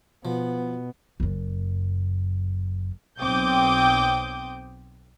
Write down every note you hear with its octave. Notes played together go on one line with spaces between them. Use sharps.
B2 F3 B3
F#1 F#2
B1 C4 G5 D6 D#6 G6